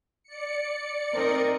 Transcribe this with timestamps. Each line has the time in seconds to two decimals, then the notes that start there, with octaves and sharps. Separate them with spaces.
0.23 D5 C#7
1.13 C4 D#4 A#4